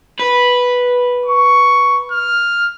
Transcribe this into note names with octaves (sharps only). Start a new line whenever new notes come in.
B4
C#6
F6